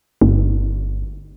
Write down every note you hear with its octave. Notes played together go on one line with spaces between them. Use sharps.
G1